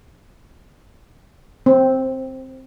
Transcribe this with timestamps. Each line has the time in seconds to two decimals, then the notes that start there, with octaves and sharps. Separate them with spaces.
1.66 C4